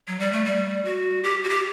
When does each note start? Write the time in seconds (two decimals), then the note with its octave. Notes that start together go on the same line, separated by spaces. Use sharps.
0.08 F#3
0.19 G3
0.32 A3
0.45 G3
0.85 F#4
1.24 G4
1.44 F#4
1.49 G4